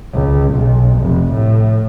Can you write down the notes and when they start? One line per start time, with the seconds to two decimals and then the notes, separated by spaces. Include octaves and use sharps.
0.14 C#2
0.53 B1
0.99 F1
1.33 A2